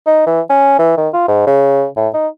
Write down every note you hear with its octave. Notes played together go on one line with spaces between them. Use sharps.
D#4
E3
C#4
E3
D#3
F4
G#2
C#3
A2
D#4